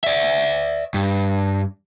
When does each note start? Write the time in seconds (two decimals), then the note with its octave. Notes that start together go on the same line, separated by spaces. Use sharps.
0.04 D5 E5
0.94 G2